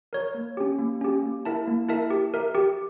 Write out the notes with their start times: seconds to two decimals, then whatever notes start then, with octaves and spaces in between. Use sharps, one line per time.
0.13 A#4 C#5
0.34 A#3
0.57 C#4 G4
0.79 A#3
1.01 C#4 G4
1.23 A#3
1.45 E4 A#4 E5 A5
1.67 A#3
1.88 E4 A#4 E5 A5
2.10 G4
2.34 A#4 E5
2.55 G4